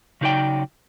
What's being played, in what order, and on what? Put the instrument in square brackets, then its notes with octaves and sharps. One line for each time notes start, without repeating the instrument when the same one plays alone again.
[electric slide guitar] C#3 F#3 D#4 A#4 D5 G5